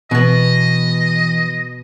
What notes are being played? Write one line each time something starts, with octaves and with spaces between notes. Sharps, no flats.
B2 E3 B3 D#5